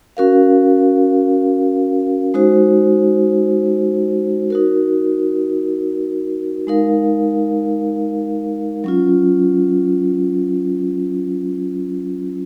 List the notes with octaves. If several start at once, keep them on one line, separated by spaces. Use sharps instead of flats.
C#4 F#4 A#4 F5
G#3 D#4 F#4 C5
D#4 F#4 A#4
G#3 D#4 A#4 F5
F#3 C#4 F4